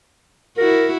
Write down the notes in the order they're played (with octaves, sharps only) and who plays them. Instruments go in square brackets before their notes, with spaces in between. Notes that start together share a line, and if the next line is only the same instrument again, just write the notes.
[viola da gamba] E4 F#4 [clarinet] A#4